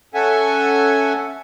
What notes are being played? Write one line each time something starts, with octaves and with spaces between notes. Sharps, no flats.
C#4 A4 E5 F#5 G#5